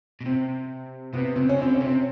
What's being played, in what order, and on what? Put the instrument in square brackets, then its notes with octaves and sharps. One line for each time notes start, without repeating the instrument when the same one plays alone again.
[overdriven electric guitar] B2
[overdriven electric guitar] C3 [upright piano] C4
[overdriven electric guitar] C3 [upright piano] B3
[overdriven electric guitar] C#3 [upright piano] C4
[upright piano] C#4
[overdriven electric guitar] D3 [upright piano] C4
[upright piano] C#4
[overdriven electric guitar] C3
[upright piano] C4